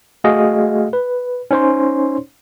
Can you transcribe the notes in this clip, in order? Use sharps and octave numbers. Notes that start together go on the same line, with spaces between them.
A3 F#4 G#4 D#5 F5
B4
C#4 D#4 C5 C#5 C6